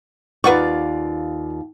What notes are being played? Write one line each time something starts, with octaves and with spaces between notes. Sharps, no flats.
D#2 F4 B4 D5 F#5 C#6